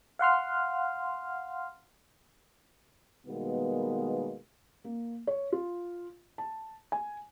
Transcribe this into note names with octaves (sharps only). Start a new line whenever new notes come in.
F5 F#5 C6 F6
B2 D#3 G3 G#3 A#3 B3
A#3
C#5
F4
A5
G#5